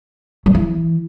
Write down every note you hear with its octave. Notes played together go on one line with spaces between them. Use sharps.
F#3
E3